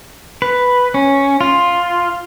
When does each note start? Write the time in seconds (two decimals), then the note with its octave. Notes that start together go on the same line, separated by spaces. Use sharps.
0.42 B4
0.94 C#4
1.41 F4